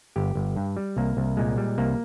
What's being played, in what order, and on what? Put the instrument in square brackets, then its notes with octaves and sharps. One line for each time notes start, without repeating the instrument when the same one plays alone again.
[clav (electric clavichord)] G1 G4
G1
G2
G3
C2 A#3
C2
A#2 G#3
G3
C2 A#3